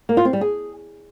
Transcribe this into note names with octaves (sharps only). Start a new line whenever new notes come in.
A#3
F4
C4
G3
G#4